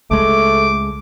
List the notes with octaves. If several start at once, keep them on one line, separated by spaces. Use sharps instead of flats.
C#2 G#3 A3 D6